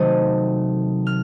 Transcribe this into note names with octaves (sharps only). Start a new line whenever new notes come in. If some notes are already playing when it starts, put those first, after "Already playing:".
Already playing: C3 D#3 F#3 A3 C4 D#6
F6